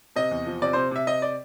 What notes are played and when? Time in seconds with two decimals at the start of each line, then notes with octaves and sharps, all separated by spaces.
0.16 C3 D#5
0.31 E2
0.46 F3
0.62 C3 D5
0.73 C3 C5
0.91 C3 E5
1.07 C3 D#5
1.22 D5